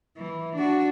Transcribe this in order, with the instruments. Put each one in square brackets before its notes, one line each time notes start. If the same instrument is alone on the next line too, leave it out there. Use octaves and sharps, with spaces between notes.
[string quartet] E3
D4 F#4